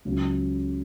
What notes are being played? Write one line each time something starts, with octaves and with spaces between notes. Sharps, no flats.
C#2 C#3 F#3